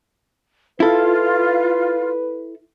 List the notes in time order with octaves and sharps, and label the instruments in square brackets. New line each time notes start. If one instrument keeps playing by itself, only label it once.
[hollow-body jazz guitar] E4 A4 [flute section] F4 [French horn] B4